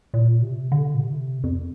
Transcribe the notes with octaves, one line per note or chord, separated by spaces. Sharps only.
A#2
C3
D3
A#2
C3
F2